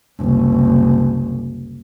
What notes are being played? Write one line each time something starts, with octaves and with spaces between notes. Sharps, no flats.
F#1 C2